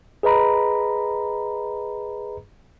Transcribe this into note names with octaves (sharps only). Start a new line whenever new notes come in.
G#4 B4 D#5 A#5 B5